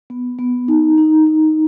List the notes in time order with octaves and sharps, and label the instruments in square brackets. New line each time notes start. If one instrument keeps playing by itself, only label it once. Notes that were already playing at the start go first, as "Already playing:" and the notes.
[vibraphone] B3
B3
D#4
D#4
D#4